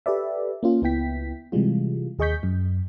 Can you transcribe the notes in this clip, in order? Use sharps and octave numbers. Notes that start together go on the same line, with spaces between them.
G4 A4 B4 D5 E5
A#3 C#4 F4
C#2 B3 E4 G5 B6
C3 E3 G3 G#3 F4
D#2 G#4 D#5 C#6 G6 B6
F#2